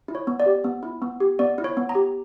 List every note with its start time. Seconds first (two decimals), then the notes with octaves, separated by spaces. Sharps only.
0.08 E4
0.15 C#5
0.27 B3
0.40 D5
0.46 G4
0.64 B3
0.83 E4
1.02 B3
1.20 G4
1.39 B3 D5
1.58 E4
1.64 C#5
1.77 B3
1.89 A#5
1.95 G4